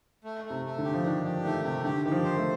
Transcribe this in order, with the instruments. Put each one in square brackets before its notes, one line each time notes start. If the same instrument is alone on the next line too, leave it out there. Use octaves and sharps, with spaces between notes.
[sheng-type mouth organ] A3
A3
[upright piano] C3
[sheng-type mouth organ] A3
[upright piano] D3
[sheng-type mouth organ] G4
[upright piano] F3
[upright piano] D#3 [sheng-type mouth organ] D4
[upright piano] F3 [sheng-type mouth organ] G4
[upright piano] D#3 [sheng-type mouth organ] A3
[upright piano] C3 [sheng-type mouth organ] G4
[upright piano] D3 [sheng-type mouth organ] G4
[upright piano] D#3 [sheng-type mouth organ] G4
[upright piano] F3
[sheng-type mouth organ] C5
[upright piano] A3